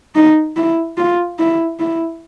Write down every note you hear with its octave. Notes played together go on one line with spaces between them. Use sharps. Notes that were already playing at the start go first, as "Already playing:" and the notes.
D#4
E4
F4
E4
E4